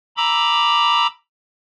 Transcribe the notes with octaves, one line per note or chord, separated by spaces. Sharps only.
A#5 B5 D6 E6